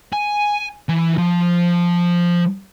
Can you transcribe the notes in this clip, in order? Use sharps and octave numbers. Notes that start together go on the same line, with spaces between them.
G#5
E3
F3